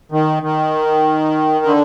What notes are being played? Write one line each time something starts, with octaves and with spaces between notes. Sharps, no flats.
D#3
D#3
D3